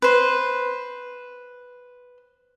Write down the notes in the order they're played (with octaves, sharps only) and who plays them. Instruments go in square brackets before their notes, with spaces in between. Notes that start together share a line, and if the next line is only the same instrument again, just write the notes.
[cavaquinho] B4 C5